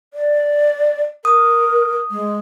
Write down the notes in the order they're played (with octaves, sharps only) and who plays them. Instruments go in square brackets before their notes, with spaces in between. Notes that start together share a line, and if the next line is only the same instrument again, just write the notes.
[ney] D5
[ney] A#4 [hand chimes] D#6
[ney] G#3